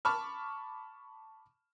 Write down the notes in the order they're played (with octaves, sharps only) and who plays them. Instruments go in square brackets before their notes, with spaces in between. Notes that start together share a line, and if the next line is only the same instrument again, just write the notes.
[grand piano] A5 B5 C#6 D6 F6